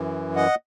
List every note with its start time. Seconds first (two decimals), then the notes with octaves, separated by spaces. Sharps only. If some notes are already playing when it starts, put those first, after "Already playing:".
Already playing: F#2 E3
0.36 D#5 F#5